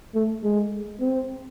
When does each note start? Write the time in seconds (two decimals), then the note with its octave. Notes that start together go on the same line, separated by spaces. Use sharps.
0.15 A3
0.44 G#3
1.01 C4